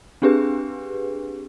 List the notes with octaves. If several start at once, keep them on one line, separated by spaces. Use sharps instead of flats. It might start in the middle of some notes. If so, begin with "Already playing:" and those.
C4 D4 G4 G#4 B4